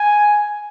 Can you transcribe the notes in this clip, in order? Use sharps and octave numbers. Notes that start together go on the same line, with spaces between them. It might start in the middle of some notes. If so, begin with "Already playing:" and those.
Already playing: G#5